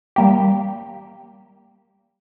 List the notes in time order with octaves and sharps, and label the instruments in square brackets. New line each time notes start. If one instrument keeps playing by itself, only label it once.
[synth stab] G3 A#3 G4